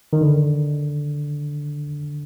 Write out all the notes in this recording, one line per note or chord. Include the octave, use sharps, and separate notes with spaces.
D#3
D3